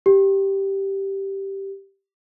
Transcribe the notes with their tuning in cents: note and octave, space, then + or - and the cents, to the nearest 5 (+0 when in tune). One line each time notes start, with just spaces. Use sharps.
G4 -5